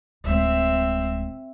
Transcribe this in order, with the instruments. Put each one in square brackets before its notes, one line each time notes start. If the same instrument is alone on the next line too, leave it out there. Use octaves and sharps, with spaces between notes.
[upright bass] D1 G#3 [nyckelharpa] C4 E5